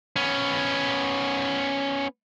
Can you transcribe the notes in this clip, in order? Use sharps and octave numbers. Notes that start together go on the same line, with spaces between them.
B3 C#4